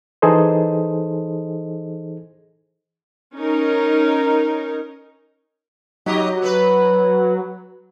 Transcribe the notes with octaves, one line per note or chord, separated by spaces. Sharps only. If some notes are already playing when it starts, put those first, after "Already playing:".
E3 D#4 G#4 A4 C5 D#5
C#4 D#4 A#4
F#3 D#4 G4 D#5
B3 B4